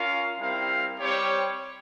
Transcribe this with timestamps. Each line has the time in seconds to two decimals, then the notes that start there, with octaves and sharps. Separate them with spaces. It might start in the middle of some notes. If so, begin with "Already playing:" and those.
Already playing: C#4 F4 A#4 F5
0.38 G3 C4 E4 A#4 F5
0.99 G3 C4 G4 C#5